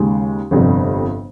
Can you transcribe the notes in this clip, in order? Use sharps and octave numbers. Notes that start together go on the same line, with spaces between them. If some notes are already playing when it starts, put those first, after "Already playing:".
Already playing: D#2 C#3 G#3
G1 F2 C3 G3